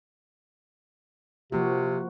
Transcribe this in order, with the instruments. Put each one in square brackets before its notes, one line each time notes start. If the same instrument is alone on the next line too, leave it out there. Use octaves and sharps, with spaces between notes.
[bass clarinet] C3 [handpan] F3 A#3 F#4